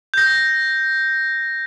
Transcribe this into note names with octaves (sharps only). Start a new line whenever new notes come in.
G6 A#6